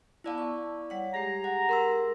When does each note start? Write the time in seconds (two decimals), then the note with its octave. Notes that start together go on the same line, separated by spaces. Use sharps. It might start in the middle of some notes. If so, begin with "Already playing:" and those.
0.24 B3 E4 D5 F5 A5 E6
0.38 C#6
0.90 G3 C#5 F#5
1.14 G#3 G4 G#4 A#5
1.44 F#5
1.69 A#4 C6 E6